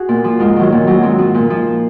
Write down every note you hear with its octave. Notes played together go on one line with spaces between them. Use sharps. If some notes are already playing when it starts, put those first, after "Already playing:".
Already playing: F#4 G#4
A#2
F3
G#2 F4
D#3 F#3
A#2
F#3
G#2 C4
F3
A#2
F3